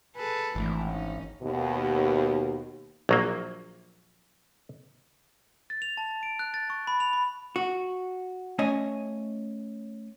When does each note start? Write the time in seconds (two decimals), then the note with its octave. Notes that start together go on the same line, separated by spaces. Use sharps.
0.15 G#4 A4 B4
0.55 G#1 E3 A3 D4
0.87 C#4 D#4
1.42 D#2 B2
3.09 A#1 F#3 A#3
5.70 A6
5.82 F7
5.97 A5
6.23 D7
6.39 F#6
6.54 A6
6.70 C#6
6.87 B5
7.00 F7
7.13 B5
7.56 F#4
8.59 A3 C#4 C#5 D#5 G#5